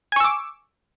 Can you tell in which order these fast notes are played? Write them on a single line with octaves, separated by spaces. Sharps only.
G#5 C#6 E6 D6